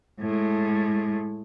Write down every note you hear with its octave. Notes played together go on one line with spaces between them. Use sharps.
A2 G#3